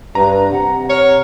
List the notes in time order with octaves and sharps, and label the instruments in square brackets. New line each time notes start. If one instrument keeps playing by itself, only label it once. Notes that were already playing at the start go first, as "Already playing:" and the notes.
[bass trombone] G2 [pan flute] B4 [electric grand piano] A#5
[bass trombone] C3 [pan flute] F#5
[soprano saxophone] C#5 [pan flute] F6